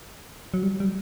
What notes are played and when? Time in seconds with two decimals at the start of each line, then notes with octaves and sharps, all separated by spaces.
0.54 F#3
0.63 G3
0.80 G3